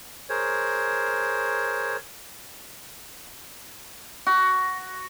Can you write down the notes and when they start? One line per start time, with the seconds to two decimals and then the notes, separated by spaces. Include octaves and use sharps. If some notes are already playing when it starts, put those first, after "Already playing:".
0.30 G#4 A#4 C5 C#5
4.26 F#4